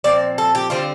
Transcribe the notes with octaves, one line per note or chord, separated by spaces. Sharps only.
A#2 F3 C4 D5
A4
G4
D3 G3 C4 F4